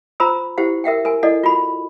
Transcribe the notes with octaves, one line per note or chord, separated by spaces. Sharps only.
F4 C5 A#5 B5 E6
E4 G4 C5 F#5
A#4 E5 F#5 G5
A#4 G#5
E4 A4 D5 D#5 F#5
F4 F#4 B5